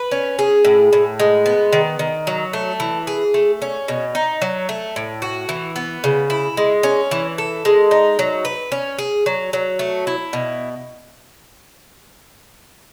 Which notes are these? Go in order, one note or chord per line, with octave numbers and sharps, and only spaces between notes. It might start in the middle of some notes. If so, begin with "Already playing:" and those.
Already playing: B4
C#4
G#4
A2
A2
G#3
B3
D#3
D#3
F#3
A3
E3
G#4
A3
C#4
B2
D#4
F#3
A3
A2
F#4
E3
B3
C#3
E4
G#3
C#4
E3
A4
G#3
D#4
F#3
B4
C#4
G#4
F#3
F#3
A3
E4
B2